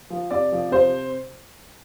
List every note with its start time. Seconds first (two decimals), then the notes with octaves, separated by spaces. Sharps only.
0.10 F3
0.31 C3 D5
0.52 F3
0.71 C3 C5